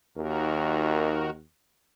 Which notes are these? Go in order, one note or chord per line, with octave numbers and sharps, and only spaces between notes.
D#2 D#3 F#4 A#4